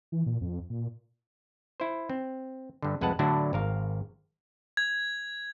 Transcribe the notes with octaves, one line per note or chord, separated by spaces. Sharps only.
E3
A#2
F2
A#2
E4 C5
C4
G2 D3
C2 F2 G#3 B4 F#5 A5
A2 D3 F#3 D4 E4 F#4
G#1 A#4 F5
G#6